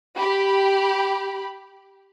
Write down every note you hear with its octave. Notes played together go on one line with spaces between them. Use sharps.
G4 B5